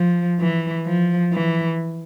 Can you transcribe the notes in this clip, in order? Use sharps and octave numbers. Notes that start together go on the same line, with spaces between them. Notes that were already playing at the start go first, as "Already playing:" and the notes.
Already playing: F3
E3
F3
E3